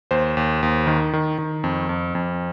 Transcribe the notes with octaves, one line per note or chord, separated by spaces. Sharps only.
D#2 C5
D#2
D#2
D#3
D#3
D#3
F2
F2
F2